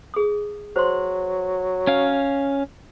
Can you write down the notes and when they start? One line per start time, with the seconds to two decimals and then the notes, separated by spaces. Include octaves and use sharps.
0.14 G#4 D#6
0.76 F#3 C5 C6
1.87 C#4 F5